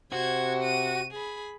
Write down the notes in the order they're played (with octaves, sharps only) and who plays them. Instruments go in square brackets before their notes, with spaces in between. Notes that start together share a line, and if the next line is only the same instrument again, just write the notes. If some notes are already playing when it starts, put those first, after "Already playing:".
[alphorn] C3 [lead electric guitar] F#4 [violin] C5 G#6
[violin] D#7
G#4 B5